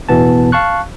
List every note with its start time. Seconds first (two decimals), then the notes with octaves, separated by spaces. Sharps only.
0.09 A1 E2 B2 E3 B3 A5
0.52 F5 A5 C#6 F#6